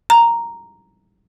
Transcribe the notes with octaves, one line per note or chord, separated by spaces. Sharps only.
A#5